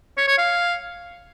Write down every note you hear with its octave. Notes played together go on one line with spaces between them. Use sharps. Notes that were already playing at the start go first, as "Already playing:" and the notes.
C#5
C#5
F5